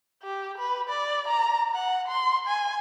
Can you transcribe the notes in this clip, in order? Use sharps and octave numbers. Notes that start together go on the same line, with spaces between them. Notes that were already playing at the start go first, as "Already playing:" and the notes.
G4
B4
D5
A#5
F#5
C6
G#5